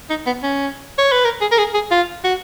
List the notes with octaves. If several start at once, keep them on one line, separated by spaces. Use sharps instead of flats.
D#4
B3
C#4
C#5
B4
A#4
G#4
A#4
G#4
G#4
F4
F#4